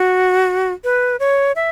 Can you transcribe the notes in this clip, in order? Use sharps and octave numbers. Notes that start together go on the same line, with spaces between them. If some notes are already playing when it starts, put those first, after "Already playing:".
Already playing: F#4
B4
C#5
E5